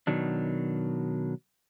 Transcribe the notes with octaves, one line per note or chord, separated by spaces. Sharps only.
B2 D#3 F#3 D4